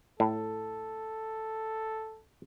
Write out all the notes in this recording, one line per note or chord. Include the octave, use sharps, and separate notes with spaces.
A2 A4